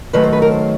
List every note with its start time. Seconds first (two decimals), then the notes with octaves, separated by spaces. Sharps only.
0.13 F#2 D#3 F#3 A3 B4
0.24 C5
0.33 B4
0.42 A#4
0.52 C5